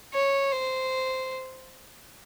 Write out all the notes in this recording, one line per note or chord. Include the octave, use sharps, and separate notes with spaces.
C#5
C5